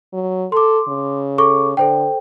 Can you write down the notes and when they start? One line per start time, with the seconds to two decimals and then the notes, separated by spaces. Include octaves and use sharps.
0.13 F#3
0.52 A4 C6 D6
0.88 C#3
1.38 A4 C#6 D6
1.77 D3 A4 C5 G5